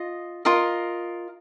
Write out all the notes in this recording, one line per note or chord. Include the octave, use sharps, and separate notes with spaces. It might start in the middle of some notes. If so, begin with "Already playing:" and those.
Already playing: F4 D#5
F4 A#4 D#5